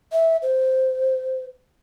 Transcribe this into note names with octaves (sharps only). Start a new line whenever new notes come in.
E5
C5